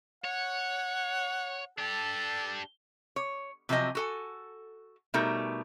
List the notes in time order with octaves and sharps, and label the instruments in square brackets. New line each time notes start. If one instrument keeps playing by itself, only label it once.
[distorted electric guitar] C#5 [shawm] F#5
[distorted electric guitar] D4 G4 [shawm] A4
[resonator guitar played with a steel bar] C#5
C3 F3 F#3 C4 D#5 G#5
F#4 A4 G#5
B2 G3 A3 D#4 A#4